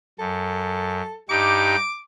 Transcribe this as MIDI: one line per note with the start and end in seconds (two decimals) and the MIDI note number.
0.19 1.01 42
0.19 1.17 69
1.29 1.76 43
1.29 1.76 63
1.29 1.76 67
1.29 2.01 86